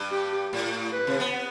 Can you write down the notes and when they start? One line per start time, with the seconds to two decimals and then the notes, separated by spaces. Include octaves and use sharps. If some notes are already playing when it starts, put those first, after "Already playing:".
Already playing: G2
0.12 G4
0.53 A2
0.93 B4
1.07 C3
1.20 B3